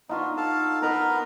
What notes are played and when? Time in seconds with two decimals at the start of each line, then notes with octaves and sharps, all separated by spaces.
0.09 B3 D4 D#4 F4 F#4
0.37 A4 F5 A5
0.82 B3 D#4 A#4 B4 A#5